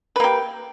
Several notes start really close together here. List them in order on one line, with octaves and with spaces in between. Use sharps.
B4 A#3 G4